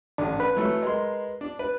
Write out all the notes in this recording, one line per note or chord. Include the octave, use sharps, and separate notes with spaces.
A1 D4
B4
E3 F#3 A3
G#3 A#4 C6
D4
B4